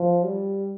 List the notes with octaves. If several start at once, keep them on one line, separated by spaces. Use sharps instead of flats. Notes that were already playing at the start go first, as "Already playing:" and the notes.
Already playing: F3
G3